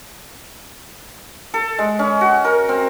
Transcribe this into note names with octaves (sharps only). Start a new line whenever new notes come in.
A4
G#3
C#4
F#4
A#4
C4